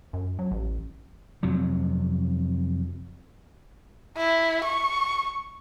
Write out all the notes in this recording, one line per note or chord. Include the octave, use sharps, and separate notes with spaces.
F#2
F#3
A1
F2 C3 F#3
E4
C#6